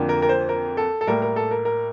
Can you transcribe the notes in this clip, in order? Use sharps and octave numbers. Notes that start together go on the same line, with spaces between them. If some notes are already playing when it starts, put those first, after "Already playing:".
Already playing: F2 D3 F3 A#3
A#4
A#4
C5
A#4
A4
A4
A2 G3 A#3 A#4
A#4
A4
A#4
A#4